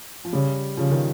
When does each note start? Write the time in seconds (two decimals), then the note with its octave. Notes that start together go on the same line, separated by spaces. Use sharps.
0.25 F3
0.33 C#3 G3
0.77 C#3 F3
0.91 D#3